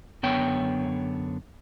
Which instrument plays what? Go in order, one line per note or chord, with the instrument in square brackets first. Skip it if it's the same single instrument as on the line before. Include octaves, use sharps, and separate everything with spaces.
[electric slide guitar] F#2 D3 B3 C#5 G5